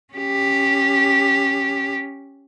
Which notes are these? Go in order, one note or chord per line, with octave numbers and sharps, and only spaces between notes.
C#4 G4